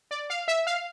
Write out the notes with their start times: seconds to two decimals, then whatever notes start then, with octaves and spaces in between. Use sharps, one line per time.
0.11 D5
0.30 F5
0.48 E5
0.67 F5